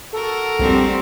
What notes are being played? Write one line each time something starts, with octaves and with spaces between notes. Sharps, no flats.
F#4 A4 A#4
A#1 G3 C4